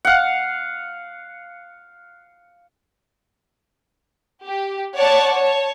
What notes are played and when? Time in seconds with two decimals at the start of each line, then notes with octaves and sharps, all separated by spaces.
0.05 F5 F#5
4.45 G4
4.95 C#5 D5 F#5 A5 C#6
5.33 C#5 A5